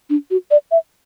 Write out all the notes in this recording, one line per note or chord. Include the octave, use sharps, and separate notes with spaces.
D4
F#4
D5
E5